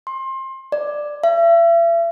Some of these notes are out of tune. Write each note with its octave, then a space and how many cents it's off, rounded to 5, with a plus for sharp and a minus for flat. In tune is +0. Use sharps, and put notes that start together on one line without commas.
C6 +25
D5 +10
E5 +40